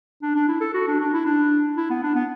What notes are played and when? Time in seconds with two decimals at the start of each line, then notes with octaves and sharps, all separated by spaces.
0.23 D4
0.36 D4
0.48 E4
0.61 A4
0.74 F#4
0.88 D4
1.00 D4
1.13 E4
1.26 D4
1.77 E4
1.90 B3
2.03 D4
2.16 B3